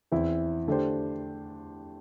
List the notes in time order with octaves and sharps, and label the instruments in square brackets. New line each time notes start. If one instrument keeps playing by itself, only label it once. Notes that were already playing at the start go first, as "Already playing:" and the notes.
[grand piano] E2 E3 C4 E4
D3 A3 D4 G4 C5